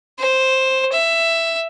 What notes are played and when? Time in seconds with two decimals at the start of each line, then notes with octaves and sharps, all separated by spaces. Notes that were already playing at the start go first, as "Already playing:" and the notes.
0.19 C5
0.92 E5